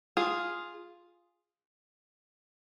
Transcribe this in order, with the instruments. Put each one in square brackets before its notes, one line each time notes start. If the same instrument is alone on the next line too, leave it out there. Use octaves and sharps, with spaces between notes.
[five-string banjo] F4 G#4